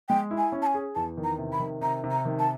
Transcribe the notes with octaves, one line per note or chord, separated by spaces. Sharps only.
G#3 G5
E4
G#5
C#4
A5
G#5
G#4
E2 A5
D#3
A#5
C3
B5
D#3
C3 A#5
C3
A#5
D#3
A5